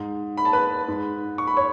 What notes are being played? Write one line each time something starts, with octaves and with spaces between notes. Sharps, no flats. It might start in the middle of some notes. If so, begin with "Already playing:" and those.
Already playing: G#2
B5
A5
B4 B5
G#2
C#6
B5
C#5 C#6